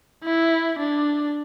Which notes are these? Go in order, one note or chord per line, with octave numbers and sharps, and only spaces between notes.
E4
D4